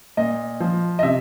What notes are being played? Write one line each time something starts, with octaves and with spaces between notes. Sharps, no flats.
A#2 D#5
F3
D#5
C3 E5